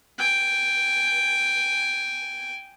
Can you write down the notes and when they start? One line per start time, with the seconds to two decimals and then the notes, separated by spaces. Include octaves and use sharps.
0.18 G5 G#5